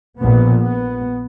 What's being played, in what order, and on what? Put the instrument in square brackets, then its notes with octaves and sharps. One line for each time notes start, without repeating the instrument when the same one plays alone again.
[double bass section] A#1 A#2 B3
B3